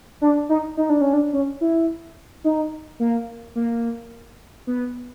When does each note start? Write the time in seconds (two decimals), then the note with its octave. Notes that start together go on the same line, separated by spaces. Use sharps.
0.22 D4
0.49 D#4
0.77 D#4
0.90 D4
1.01 C#4
1.13 D4
1.33 C#4
1.61 E4
2.44 D#4
3.00 A#3
3.56 A#3
4.67 B3